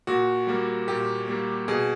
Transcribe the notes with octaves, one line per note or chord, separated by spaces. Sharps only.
A#2 F#4
G3 A#3
A#2 G4
G3 A#3
B2 G#4